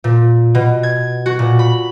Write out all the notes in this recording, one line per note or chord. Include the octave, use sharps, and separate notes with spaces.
A#2
B2
G#6
F#4
A#2
B5